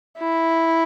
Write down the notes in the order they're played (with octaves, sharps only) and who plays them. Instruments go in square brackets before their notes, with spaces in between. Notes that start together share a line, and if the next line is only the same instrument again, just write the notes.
[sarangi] E4